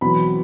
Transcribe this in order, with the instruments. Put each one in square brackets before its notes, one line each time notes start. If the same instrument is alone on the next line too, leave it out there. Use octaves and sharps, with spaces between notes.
[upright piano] E2 B2 F#3 C4 B5